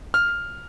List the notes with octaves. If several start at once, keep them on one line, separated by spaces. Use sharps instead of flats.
F6